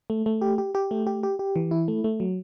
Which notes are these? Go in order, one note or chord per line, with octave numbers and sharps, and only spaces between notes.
A3
A3
G4
G4
G4
A3
G4
G4
G4
E3
E4
A3
A3
F#3